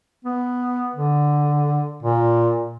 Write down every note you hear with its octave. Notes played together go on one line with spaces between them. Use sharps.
B3
D3
A#2